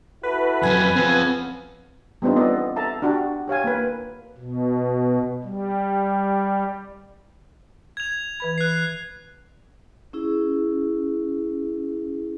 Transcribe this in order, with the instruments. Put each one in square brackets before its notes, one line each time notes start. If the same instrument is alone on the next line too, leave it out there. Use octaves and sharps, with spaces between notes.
[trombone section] E4 F#4 A4 [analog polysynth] B4
[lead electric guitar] F2 F#3 [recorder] G#5
[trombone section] C#3 B3 [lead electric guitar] F3 C4
[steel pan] G3 B3 C4 D4 D#4 F4
B3 A4 D5 D#5
A4 E5 A5 A#5
D4 F#4 G4
G4 C#5 F5 G#5
A#3 B4
[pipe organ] B2
G3
[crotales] G#6 F7
[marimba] E3 B4 B5
[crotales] F#6 C7
[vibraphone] C#4 E4 G#4